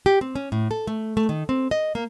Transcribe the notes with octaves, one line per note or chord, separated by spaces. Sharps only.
G4
C4
C#4
A2
A4
A3
A3
D#3
C4
D#5
A#3